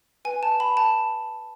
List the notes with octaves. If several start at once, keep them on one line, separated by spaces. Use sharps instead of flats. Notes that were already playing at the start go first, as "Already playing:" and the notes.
B4 G#5
A5
F#5 B5
A5